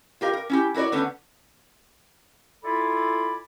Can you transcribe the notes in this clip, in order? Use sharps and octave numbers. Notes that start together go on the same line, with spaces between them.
F4 G4 A#4 E5 F5
A#4
C#4 E4 G4
E4 F#4 A#4 C#5 D5
D3 A3 B3 C#4
E4 F4 A4 D5 G#5 B5